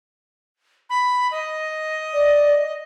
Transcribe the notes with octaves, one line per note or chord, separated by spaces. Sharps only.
B5
D#5
D5